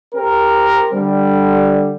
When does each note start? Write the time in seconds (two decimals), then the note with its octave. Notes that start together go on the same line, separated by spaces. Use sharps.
0.15 C4 G4 A#4
0.93 D3 G3